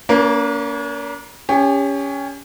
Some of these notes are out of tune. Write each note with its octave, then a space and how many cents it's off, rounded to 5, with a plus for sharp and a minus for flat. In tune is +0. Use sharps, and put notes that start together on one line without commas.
A#3 +0 C#4 +45 B4 -45
C#4 +15 G4 +40